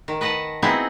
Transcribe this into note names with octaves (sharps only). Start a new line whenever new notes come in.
D#3
B4 D#5 F#5 A5
B3 C4 D#4 E4 F#4 G#4